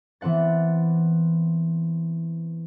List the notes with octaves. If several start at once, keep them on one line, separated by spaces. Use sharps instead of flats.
E3 B3 C4 F#5 A6